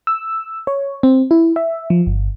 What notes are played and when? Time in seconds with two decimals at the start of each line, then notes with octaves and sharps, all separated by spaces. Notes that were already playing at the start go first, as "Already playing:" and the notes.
0.07 E6
0.67 C#5
1.03 C4
1.31 E4
1.56 E5
1.90 F3
2.07 G1